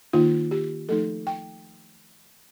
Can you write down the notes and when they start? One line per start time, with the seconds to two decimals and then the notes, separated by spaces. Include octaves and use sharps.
0.13 D#3 A#3 D#4 F4
0.51 G4
0.89 F3 A3 D#4 A4
1.27 G5